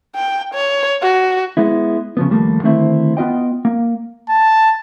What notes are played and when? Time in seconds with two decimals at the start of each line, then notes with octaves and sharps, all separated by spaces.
0.15 G5
0.54 C#5
1.02 F#4
1.57 G#3 B3 E4
2.17 C#3 F3 B3
2.30 D#2 F3 G3 A3 A#3
2.63 D3 D#3 A3 C4 E4 C5
3.17 B3 F4 D#5 G5
3.65 A#3
4.29 A5